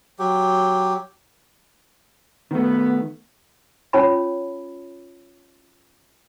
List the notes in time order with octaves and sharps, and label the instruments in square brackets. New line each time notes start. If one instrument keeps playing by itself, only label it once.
[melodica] F#3 G4
[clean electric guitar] D#3 A3 [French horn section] B3
[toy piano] C#4 F4 C#5 A5 B5